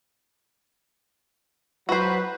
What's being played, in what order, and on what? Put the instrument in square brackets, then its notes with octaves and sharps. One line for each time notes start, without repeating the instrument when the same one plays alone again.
[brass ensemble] F#3 B4 [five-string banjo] F#4 C5